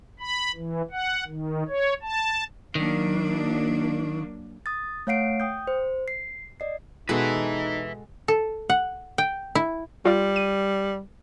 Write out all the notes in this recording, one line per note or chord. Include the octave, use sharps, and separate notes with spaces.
B5
E3
F#5
D#3
C#5
A5
D#3 F#3 A#3 D4
D#6 A6
A3 C#5 F5 F#5 C7 D7
G5 D#6 G6
C5
C7
D5 D#5 C7
B2 G#3 D#4 F#4 A4 B4 E5
A4
F#5
G5
E4
G3 F4 D5
D#7